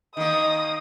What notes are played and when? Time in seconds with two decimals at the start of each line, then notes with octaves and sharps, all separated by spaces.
0.17 D#3 A#3 D#5 D#6